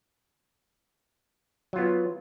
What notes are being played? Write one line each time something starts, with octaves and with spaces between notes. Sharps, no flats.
F#3 B3 F4